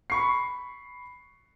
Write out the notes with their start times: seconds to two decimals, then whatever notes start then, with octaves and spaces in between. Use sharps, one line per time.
0.10 B5 C#6 C7